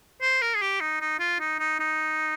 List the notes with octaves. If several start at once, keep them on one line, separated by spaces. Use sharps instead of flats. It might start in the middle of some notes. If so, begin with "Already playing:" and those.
C5
A#4
G#4
G4
D#4
D#4
F4
D#4
D#4
D#4